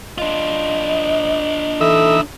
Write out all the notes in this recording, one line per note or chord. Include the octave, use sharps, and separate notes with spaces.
D4 F4 D#5
E3 D#4 A4 E5